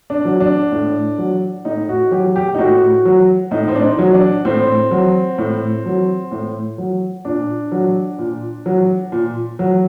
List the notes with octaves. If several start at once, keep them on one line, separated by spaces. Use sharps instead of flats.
D4
F#3
D4
A2
F#3
A2 D#4
F#4
F#3 G4
G4
D#4
A2 F#4
F#3
A2 D#4
C4
D4
D#4
F#3
D4
A2 C4
F#3
A2
F#3
A2
F#3
A#2 D4
F#3
A#2
F#3
A#2
F#3